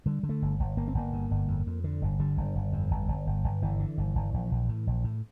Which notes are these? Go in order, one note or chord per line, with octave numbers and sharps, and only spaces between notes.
D3 G3
D3
A3
G1
G1
G1 A#3
C4
G1 A#3
G2
G1
F2
F2
D3
G1
D3 G3
G1
G1
F2
G1
G1
G1
G1
G1 E3
D3
G1
G1
A#1
A#1
A2
A#1
A2